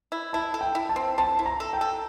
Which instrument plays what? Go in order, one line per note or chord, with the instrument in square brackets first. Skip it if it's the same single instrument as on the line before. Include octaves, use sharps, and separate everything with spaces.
[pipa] E4
[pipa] E4 [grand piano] A5
[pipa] A4
[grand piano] G5
[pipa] E4
[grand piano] A5
[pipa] C4
[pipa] C4 [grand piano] A5
[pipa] E4
[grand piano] A#5
[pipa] A4
[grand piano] G5
[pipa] A4